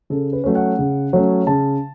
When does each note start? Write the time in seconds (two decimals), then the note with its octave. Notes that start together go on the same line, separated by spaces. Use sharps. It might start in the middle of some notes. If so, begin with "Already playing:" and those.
0.10 C#3 A4
0.33 B4
0.44 F#3 A3 C#4
0.55 F#5
0.79 C#3
1.13 F#3 A3 C#4
1.47 C#3 A5